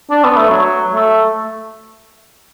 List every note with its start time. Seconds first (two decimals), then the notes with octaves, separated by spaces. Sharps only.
0.10 D4
0.24 B3
0.37 A3
0.50 F#3
0.94 A3